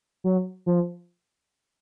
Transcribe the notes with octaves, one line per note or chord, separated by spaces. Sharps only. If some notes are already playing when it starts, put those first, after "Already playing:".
F#3
F3